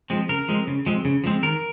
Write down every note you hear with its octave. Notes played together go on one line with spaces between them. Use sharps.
F3 G#3 C4
C#3 A#4
F3 G#3 C4
C#3
F3 G#3 C4
C#3
F3 G#3 C4
D#3 A#4